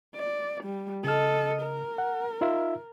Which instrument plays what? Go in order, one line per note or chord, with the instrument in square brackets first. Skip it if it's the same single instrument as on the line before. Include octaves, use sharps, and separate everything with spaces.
[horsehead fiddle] D5
G3
[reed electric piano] C#3 F6 [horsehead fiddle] A4 D#5
[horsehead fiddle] A#4
[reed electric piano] F#5
D#4 F4 E5